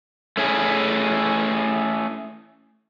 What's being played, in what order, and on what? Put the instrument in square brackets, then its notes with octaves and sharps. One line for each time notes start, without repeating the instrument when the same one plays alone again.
[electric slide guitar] A3 C#4 E4 G#4